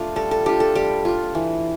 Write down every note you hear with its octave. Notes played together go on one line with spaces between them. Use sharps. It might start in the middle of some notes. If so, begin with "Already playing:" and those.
Already playing: A3 D4 F4
G3 A4
A4
D4 F4 G4
A4
G3 G4
D4 F4
E3